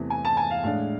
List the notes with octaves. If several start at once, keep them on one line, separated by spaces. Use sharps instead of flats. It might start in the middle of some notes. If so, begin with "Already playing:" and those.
Already playing: E2 C3 E3 A3 C4
G#5
A5
G#5
F5
A2 G#3 D4 F5